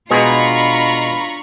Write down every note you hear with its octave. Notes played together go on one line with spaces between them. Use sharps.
B2 G#3 D4 F4 G#4 A#5 B5 C#6